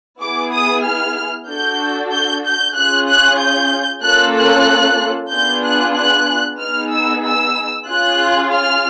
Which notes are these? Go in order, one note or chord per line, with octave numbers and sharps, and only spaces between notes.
B3 E4 G#4 D6
D#6
F6
D4 F#4 A4 G6
G6
G6
C#4 F4 G#4 F#6
F#6
G6
A#3 C#4 F4 A4 F#6
F#6
B3 D4 F4 G#4 G6
F#6
F#6
B3 D#4 G#4 F6
E6
E6
C#4 F4 G#4 F#6
F6